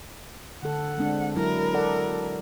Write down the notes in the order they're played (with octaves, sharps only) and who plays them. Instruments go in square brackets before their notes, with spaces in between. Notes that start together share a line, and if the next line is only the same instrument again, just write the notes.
[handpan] D3 A4 [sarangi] F#5
[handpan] G#3 C4 D4
[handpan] F#3 E4 [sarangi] A#4
[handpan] A4 D5 F#5